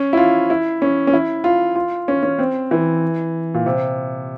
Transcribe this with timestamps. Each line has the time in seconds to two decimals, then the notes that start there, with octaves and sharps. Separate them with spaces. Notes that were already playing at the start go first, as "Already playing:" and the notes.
Already playing: C#4
0.13 E4
0.17 F4
0.50 E4
0.82 C#4
1.07 C#4
1.13 E4
1.44 F4
1.76 F4
2.08 C#4
2.23 C#4
2.39 C4
2.71 E3
3.54 A#2
3.66 C3